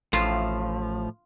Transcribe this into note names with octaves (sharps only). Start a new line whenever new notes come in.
A1 A2 F3 F4